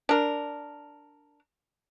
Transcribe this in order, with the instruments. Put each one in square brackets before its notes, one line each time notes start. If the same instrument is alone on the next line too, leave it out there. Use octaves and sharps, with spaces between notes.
[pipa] D4 A#4